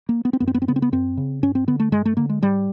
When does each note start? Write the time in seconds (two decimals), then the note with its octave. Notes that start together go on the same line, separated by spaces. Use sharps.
0.09 A#3
0.25 B3
0.33 C4
0.40 F#2 B3
0.47 C4
0.54 B3
0.62 C4
0.68 C#3 B3
0.76 C4
0.82 B3
0.92 F#2 C4
1.17 C#3
1.43 G2 C#4
1.55 C4
1.68 D3 B3
1.80 A3
1.92 G2 G#3
2.05 A3
2.17 D3 A#3
2.29 G#3
2.42 G#2 G3